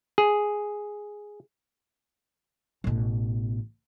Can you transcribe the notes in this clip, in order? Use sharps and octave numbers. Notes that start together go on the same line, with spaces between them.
G#4
A1 B2